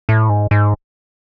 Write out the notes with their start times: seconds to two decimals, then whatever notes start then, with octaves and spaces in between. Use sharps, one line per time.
0.09 A2
0.29 G#2
0.51 G#2